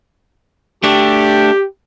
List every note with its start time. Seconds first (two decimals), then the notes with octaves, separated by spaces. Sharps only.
0.83 A3 D4 G4